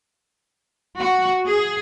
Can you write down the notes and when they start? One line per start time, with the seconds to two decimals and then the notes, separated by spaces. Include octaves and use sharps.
0.98 F#4
1.47 G#4